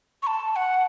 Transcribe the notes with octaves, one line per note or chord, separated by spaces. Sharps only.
C#6
A5
A5
F#5